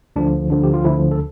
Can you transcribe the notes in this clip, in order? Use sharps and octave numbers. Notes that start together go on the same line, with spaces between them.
D2 D3 F3 D4
D2 D3 F3 D4
G4
F4
D2 D3 F3 E4
A4